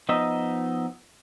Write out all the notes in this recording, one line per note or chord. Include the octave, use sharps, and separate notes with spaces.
F3 B3 D#4 D#5 E5